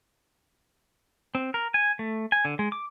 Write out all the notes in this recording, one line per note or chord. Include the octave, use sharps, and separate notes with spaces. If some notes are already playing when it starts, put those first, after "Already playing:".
C4
A#4
G#5
A3
G#5
D3
G#3
D6